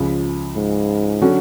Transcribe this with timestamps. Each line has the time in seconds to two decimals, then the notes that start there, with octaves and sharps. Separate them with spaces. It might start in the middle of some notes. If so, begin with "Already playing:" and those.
Already playing: C#2 C#3 F3
0.56 G#2
1.21 D3 F#3 C#4 F#4